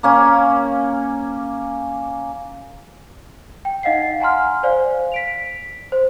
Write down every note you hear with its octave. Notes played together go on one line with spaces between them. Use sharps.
A#3 C#4 G#5
G5
D#4 D#5 F5 F#5 C7
F#5 G#5 A#5 C6 F6
C5 D5 F5 G#5
B6 D7 F7
C5